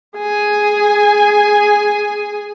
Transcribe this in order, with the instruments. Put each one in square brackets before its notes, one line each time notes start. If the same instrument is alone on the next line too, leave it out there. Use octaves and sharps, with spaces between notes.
[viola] G#4 G#5